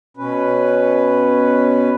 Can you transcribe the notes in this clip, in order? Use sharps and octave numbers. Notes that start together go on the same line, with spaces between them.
B2 C#4 B4